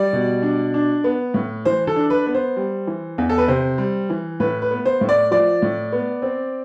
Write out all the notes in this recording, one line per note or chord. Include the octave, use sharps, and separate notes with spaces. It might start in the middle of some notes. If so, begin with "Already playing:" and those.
Already playing: G3 D5
B2
D4
D4
B3
A2
E3 C5
A4
D4
B4
B3
C5
G3
E3
E2
A4
B4
C3 C5
G3
E3
A2 B4
B4
B3
C5
A2
D5
F3 D5
A2
B3
C4